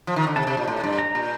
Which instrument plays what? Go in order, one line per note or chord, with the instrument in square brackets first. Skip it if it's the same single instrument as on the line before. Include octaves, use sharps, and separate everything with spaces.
[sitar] F3
D#3
D3
[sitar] C3 [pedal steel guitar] A5
[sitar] C3
A#2
A2
G2
[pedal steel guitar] A#5
[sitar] A#2